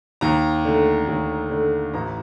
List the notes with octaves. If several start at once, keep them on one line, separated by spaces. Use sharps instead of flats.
D#2 A#5
D3 A3
D#2
D3 A3
A1 A#5